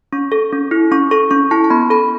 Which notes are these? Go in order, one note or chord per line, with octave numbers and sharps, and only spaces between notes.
C#4 C#6
A4
C#4
E4
C#4 C#6
A4 C#6
C#4 C#6
E4 A5
A5
B3 B5
A4 B5